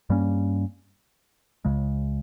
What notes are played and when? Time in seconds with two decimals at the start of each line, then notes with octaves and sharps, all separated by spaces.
0.10 G2 G3 A#3 C#4
1.65 C#2 C#3 G#3